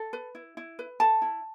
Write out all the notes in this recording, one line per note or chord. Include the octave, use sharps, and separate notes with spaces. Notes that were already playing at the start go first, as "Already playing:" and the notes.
Already playing: A4
B4
E4
E4
B4
A4 A5
E4